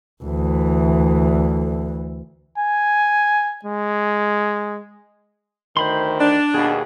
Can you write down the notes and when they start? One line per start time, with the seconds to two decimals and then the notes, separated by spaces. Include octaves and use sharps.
0.24 D2 E3
2.58 G#5
3.65 G#3
5.77 D2 D#3 C5 B5 C6
6.19 D4
6.54 D#2 B2 G#4